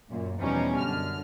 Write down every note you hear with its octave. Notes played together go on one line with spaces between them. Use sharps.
F#2 A#2
E2 B2 F3 G3 C#4 D#4
F#2 D3 F6